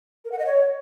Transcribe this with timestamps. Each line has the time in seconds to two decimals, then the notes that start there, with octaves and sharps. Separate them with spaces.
0.25 A#4
0.32 F#5
0.39 D#5
0.46 C#5